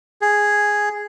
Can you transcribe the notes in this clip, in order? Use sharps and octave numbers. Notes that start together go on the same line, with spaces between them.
G#4